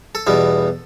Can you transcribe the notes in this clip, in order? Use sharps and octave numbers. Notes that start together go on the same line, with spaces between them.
A4
E2 B2 G3 B3